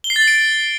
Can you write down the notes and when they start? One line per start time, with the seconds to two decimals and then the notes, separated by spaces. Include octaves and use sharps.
0.04 G7
0.10 C7
0.16 A6
0.22 F#7
0.28 D7